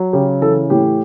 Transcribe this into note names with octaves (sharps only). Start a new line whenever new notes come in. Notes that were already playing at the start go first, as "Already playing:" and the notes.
Already playing: F#3
C#3 G4
E3 A4
A2 G4